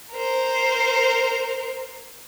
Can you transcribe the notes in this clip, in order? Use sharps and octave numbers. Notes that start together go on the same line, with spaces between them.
A#4 C5